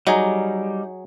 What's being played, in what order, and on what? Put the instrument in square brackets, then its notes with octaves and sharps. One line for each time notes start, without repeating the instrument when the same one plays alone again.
[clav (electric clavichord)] F#3 G#4 [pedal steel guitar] G3 [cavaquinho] D#4